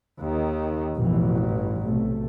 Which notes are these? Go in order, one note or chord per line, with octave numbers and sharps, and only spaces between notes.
D#2 D#3
A1 F2 B2 E3
G2 E3
B1 C3 A3